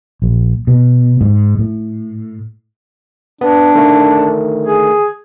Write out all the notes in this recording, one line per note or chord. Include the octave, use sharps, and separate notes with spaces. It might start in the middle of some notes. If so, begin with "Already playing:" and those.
A#1
B2
G#2
A2
B3 D4
D3 D#3 A3
G#4